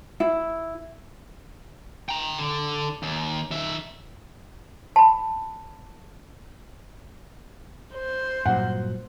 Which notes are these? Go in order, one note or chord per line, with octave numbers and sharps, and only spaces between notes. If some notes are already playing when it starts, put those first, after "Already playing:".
E4
G5 A#5
D3
D#2
D#3 E5
A5 B5
C5
G2 A#2 F#3 F#5